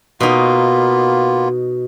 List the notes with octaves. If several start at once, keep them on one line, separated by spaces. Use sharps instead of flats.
B2 A#3 B3 D#4 F4